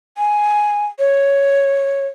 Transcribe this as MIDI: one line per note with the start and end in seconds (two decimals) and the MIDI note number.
0.18 0.86 80
0.99 2.07 73